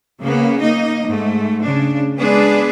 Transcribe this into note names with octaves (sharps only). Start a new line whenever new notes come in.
C#3 A#3 B3
A#3 D#4 D#5
G#2 A3
C#3 D4
G#3 B3 D4 G#4 B4